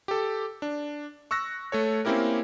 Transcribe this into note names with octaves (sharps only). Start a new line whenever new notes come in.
G4 A4
D4
C#6 E6 F#6 A#6
A3 A4 C#5
A#3 C4 C#4 E4 G4 A#4